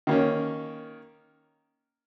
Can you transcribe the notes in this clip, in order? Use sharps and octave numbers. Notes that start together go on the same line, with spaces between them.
D#3 A#3 C#4